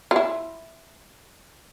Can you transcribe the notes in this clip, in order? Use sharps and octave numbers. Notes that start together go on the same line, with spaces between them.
F4
E4